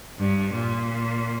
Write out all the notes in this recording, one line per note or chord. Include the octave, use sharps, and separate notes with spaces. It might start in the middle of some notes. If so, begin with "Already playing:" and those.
G2
A#2